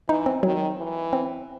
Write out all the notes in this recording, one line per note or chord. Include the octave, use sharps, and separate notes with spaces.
E3 D#4
C4
D#3 F#3
E3
C4